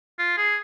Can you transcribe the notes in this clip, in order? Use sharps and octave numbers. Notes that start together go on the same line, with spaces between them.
F4
G#4